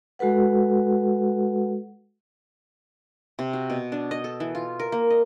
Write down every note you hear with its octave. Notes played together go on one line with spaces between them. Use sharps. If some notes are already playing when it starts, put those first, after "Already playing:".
G#3 F#4 A4 B4 F#5
C3
F#4
B2
D4
D#5
A4
E3
F4
A#4
A#3
D#5